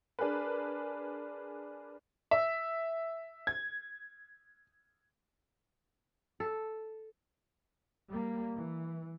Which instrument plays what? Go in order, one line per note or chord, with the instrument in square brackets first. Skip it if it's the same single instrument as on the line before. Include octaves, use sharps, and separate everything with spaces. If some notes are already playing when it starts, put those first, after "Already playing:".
[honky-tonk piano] D4 G#4 A#4 B4
[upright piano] E5
G#6
[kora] A4
[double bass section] G3 A#3
E3